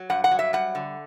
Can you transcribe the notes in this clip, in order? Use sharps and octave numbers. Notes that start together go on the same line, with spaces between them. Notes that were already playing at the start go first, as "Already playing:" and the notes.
Already playing: F#3
G2 F#5
F#5
F#3
E5
G3 F#5
D3